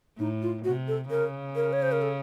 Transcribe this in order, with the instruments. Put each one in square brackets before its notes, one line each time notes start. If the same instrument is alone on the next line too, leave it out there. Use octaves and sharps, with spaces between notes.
[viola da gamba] A2 [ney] D#4
[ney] F4
[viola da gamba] C3 [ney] F#4
[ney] A4
[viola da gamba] C#3 [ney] A#4
[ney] A#4
C#5
C5
A#4
A4